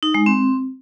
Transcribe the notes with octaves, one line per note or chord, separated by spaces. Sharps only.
D#4
G#3
C4